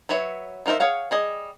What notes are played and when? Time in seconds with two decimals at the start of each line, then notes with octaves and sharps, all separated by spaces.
0.09 F#3 B4 C#5 E5
0.66 F3 D#4 A#4 C5 E5
0.80 G#4 C#5 F5 F#5
1.11 G3 G#4 D#5